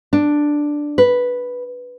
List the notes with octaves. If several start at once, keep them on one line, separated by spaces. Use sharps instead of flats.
D4
B4